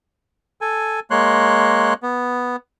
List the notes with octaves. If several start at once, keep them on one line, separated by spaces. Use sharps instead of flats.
A4 G#5
G#3 A#3 C#5 C6 F#6
B3